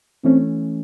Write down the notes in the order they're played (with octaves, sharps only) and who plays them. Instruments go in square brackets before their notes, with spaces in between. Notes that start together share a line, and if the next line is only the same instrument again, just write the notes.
[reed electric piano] E3 A3 C#4 [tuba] C4